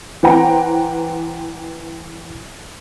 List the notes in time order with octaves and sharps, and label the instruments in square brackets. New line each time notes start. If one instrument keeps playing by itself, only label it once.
[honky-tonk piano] E3 B4 C5 F#5 G5 A#5